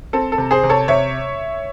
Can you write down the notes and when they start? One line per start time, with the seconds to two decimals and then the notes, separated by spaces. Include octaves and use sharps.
0.13 C4 A4
0.32 A4
0.38 C3
0.51 G#4 C5
0.64 C3
0.69 A4 C#5
0.88 C3 C#5 E5